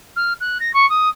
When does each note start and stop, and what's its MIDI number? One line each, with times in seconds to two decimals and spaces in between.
0.16 0.33 89
0.41 0.58 90
0.60 0.73 94
0.74 0.88 85
0.90 1.09 87